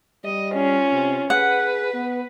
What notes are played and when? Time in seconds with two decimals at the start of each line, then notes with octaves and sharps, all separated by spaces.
0.24 G3 D#5
0.54 C#4 F4
0.92 C3
1.30 G#4 B4 F#5
1.94 B3